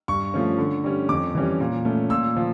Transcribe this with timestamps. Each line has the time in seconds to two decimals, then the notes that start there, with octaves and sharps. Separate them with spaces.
0.08 G2 C#6
0.34 F3 A3 C#4
0.58 D3
0.84 G3 C#4
1.09 F2 D6
1.35 E3 G3 C#4
1.60 A#2
1.85 A3 C#4
2.10 A#2 E6
2.36 F3